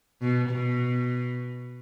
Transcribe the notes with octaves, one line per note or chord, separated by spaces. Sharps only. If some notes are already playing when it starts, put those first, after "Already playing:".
B2
B2